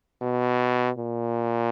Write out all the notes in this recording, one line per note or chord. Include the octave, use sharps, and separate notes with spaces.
B2
A#2